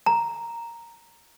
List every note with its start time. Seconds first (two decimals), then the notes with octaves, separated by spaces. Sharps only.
0.06 A#5